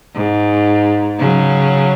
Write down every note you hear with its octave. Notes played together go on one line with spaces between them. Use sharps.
G#2
C#3 F#3